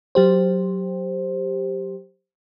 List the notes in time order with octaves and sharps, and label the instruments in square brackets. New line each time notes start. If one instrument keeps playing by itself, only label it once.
[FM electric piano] F#3 G4 C5